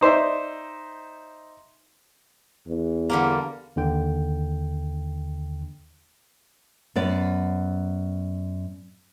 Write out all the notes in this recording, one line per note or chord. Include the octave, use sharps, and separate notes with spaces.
D#4 C5 D5 E5
E2
D3 G3 A#3
D#2 D3 G5
F#2 B3 D5